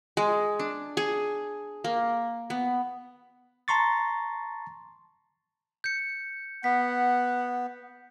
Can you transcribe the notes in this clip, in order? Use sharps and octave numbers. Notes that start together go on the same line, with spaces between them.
G#3
D4
G#4
A#3
B3
A5 A#5 C6 C#6 A6
G6 C#7
B3 F#5 B6